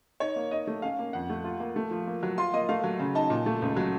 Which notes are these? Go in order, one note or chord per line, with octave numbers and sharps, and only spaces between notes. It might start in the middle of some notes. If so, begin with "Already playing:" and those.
D#4 C#5
A#3
D#4 D#5
A3
C#4 F5
A#3
F2 F#5
A3
F4
A#3
A3
F3
A#3
F#3
F4 C6
A#3 D#5
A3 F5
F#3
C#3
D#4 A5
A#2
A3
C#2
F#3